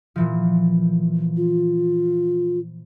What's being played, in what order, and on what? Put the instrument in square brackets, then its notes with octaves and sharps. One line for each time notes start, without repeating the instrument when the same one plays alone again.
[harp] A#2 E3 F3
[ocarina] F4